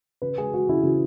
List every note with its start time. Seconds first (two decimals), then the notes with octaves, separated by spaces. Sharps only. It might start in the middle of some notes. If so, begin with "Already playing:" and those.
0.22 C#3 B4
0.38 G#3 G#4
0.54 G#3 F#4
0.69 C#3 E4
0.83 C#3